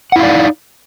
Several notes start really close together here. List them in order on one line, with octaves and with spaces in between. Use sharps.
F#5 E4 F5 D5 D#4